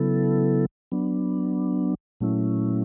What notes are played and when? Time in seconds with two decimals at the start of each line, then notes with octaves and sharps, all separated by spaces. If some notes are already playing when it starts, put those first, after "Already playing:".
Already playing: C#3 F#3 B3 E4 A4
0.92 F#3 B3 D4
2.20 A#2 F#3 A3 C#4 E4